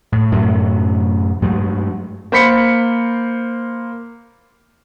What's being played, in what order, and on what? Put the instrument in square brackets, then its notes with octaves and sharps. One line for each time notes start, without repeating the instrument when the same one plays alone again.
[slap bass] A2
F#2 A2 C3 F#3
G2 F#3 G#3 A3
[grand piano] A#3 C5 B5 B6 C#7